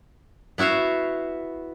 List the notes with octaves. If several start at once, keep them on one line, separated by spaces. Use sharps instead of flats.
B3 E4 F#4 E5 F5